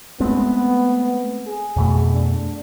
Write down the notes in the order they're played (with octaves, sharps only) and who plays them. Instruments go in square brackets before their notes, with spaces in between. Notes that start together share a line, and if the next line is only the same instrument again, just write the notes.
[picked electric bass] G#3 A3 C4 [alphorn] B3
[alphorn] G#4
[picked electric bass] F2 B2 A3
[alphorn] D4